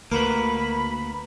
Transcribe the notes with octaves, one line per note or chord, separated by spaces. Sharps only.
D2 A#3 F#4 A#4 B4 B5